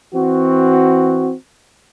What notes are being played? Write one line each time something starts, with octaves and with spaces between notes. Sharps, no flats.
E3 C4 F#4